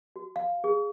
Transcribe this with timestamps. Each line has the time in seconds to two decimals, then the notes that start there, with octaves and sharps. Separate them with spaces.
0.16 F#4
0.36 F5
0.64 G#4